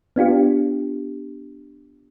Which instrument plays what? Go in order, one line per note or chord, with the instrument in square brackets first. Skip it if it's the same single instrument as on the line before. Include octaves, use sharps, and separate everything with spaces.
[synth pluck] B3 D4 F4 G4